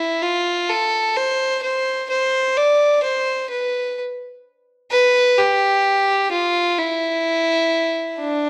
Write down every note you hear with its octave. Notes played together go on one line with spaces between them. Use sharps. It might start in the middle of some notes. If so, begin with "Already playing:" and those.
Already playing: E4
F4
A4
C5
C5
C5
D5
C5
B4
B4
G4
F4
E4
D4